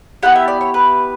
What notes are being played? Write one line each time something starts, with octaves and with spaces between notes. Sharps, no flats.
B3 E4 G4 F#5
E5
D5
C#5
B4